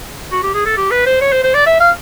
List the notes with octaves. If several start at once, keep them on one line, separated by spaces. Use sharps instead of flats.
F#4
G4
G#4
A4
G4
B4
C5
C#5
C5
C5
D5
E5
F5